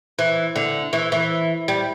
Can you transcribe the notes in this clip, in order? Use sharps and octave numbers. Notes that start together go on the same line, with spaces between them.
E3
D3
E3
E3
G3